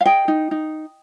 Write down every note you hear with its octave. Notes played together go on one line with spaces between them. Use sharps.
F5
G#4 D#5 G5
D#4
D#4